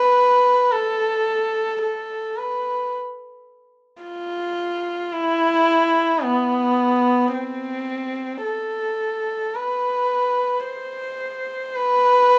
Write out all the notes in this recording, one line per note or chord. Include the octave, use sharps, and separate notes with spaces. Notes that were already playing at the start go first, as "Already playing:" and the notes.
Already playing: B4
A4
A4
B4
F4
E4
B3
C4
A4
B4
C5
B4